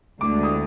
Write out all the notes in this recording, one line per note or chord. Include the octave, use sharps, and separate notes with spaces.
D2 D3 G#3 D6
D#6